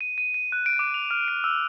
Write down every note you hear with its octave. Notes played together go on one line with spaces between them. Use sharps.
D#7
D#7
D#7
F#6
D7
D6
F7
F6
D7
E6